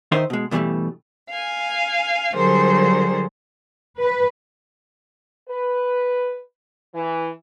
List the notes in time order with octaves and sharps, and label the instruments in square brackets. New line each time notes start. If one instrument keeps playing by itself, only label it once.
[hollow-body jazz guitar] D#3 D#4 A#4 C5 D#5 E5
B2 G#3
G2 B2 E3 F#3 G3 A3
[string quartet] F5 G#5
D3 F#3 G3 G#4 A#4 C5
[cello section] B4
[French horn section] B4
E3